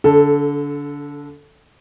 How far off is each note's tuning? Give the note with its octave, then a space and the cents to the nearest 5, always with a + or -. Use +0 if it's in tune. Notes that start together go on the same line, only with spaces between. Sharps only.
D3 -30 A4 +0